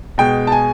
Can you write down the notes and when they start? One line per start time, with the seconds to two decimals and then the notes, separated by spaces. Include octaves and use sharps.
0.18 B2 G#3 G5
0.47 A5
0.52 G#5